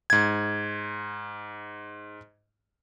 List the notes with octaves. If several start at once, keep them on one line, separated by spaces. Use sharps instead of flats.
G#2 G#6